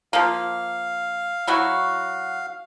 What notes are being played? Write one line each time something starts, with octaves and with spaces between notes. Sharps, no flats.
F3 A#3 F5
F#3 E4 F#4